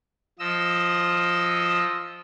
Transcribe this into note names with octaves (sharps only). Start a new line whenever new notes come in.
F3 D#5 E6